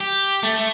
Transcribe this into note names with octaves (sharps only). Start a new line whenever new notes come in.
G4
A3